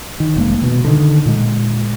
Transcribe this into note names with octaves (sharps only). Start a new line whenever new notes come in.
D#3
F1 D#3 G#3 A#3
B2
D3 D#3
A#2 G#3